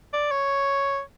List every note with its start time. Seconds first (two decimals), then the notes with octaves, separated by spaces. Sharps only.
0.13 D5
0.31 C#5